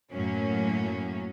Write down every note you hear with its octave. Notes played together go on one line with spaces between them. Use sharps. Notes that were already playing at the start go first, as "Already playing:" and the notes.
F#2 A2 F#3 A#3 C#4